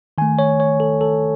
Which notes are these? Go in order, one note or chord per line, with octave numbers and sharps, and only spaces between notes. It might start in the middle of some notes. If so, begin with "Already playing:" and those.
D#3 A3 G#5
C#5
C#5
A4
A4